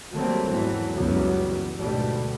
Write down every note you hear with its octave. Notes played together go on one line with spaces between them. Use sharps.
D#3 F#3 G3 A3 A#3 C4
E2 G#2 E3 F#3 A3
C#2 F#2 E3 F#3 G3 B3
D2 G#2 B2 G3 A3